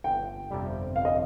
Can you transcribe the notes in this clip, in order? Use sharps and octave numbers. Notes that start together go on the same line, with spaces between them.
G1 G5
F2 C3 G3
G1 F5
D#5